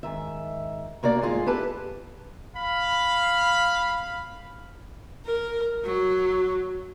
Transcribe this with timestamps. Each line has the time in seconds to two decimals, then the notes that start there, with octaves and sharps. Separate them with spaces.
0.03 G#2 D#3 E5
1.03 A3 A#3 F#4 D5
1.22 D2 G#2 F4 G#4
1.46 E4 G4 A4 B4 A5
2.56 F5 B5
5.26 A#4
5.84 F#3